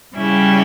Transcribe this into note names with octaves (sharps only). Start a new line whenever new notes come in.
C#3 G3 C#4 E4 G4